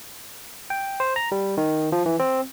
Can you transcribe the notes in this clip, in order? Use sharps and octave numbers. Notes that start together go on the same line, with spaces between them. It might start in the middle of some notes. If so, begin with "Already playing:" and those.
G5
C5
A#5
G3
D#3
F3
E3
C4